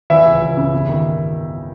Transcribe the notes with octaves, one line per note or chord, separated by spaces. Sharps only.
E3 E4 E5
C#2
C#2
C#3
G1
D#3